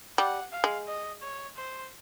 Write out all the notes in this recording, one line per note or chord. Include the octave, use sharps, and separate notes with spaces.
G3 F#5
F5
G#3
D#5
C#5
C5